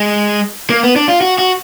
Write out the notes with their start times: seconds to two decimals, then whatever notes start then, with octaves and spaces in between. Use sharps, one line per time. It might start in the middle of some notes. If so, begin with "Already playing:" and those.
Already playing: G#3
0.70 A#3
0.83 B3
0.96 D4
1.08 F4
1.21 F#4
1.38 F#4